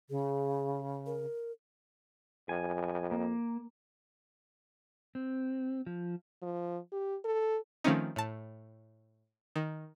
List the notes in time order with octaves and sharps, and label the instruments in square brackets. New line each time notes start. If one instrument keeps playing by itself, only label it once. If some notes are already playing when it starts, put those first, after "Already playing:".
[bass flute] C#3 [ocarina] G#4
[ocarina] A#4
[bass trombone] F2 [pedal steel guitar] G#5
[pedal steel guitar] A#3
[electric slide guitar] C4
F3
[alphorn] F3
G4
A4
[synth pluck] D#3 F3 A3 C4 C#4 D#4
A2 A5
D#3